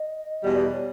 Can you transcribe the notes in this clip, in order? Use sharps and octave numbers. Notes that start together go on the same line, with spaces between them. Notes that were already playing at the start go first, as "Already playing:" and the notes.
Already playing: D#5
E2 B2 G3 D5
C#5